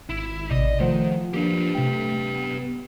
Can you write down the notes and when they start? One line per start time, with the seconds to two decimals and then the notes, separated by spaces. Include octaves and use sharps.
0.09 G#1 E4
0.51 A1 C3 D5 D#5
0.80 D#3 F3 A3 C5 F#5
1.33 A#3 D4 G4 B4
1.75 C3 A3 G5
2.36 B3